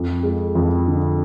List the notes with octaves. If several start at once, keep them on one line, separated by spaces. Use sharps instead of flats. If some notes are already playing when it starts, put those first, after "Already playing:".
Already playing: F2
G#3
F2
D3